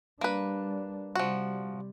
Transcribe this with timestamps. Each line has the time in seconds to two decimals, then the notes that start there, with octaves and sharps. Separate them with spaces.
0.21 G3 A#3 D4 B4
1.15 C3 F3 G3 F#4